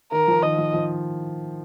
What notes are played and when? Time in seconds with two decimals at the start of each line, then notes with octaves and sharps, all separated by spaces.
0.12 D#3 A#4
0.28 F3
0.43 D#3 D#5
0.58 F3
0.74 F3